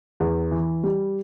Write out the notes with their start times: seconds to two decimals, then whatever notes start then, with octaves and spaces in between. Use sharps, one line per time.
0.20 E2
0.51 E3
0.83 G3